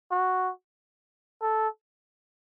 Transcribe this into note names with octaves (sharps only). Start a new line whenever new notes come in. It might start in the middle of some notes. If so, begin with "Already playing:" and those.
F#4
A4